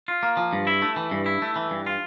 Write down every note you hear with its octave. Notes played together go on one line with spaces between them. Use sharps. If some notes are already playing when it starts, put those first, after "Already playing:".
F4
A#3
F3
G2
E4
A3
E3
G2
E4
A3
E3
G2
F4